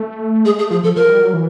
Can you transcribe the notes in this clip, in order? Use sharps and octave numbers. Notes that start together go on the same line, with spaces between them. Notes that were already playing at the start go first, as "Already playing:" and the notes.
Already playing: A3
G#3 G#4
A3 G#4
F3 G#4
F3 A4
F3 A#4
G3
F#3
E3